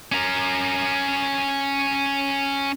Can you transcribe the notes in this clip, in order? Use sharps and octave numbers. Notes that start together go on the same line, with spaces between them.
C#4 A#4